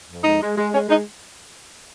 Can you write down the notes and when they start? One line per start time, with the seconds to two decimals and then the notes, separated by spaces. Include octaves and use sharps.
0.08 F2
0.24 G#3 D#4
0.41 G#3
0.57 G#3
0.73 G#3 C#4
0.89 G#3 D#4